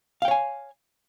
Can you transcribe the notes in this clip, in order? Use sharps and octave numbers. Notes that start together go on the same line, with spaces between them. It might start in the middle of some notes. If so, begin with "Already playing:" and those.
C#5 F5 G5 G#5